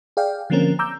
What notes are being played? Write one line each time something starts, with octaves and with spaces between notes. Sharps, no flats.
G#4 D5 F5 G5
D3 F3 A#3 C4 C#4 A#4
A#5 D6 E6 G6